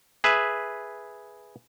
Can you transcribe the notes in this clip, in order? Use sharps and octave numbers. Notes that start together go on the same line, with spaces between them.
G#4 B4 E5